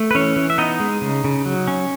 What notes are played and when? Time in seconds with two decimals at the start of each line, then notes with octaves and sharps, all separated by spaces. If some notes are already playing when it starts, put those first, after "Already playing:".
Already playing: A3
0.11 B4
0.15 E3 C#4 C#5
0.36 E3
0.50 E5
0.58 B3 D#4 D#5
0.80 G#3
1.01 C#3
1.24 C#3
1.46 F#3
1.68 C#4